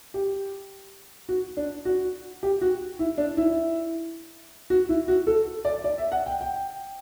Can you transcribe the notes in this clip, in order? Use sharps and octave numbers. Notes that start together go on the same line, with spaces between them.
G4
F#4
D4
F#4
G4
F#4
E4
D4
E4
F#4
E4
F#4
A4
D5
D5
E5
F#5
G5
G5